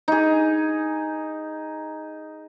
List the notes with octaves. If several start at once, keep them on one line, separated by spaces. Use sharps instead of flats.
D#4 G#4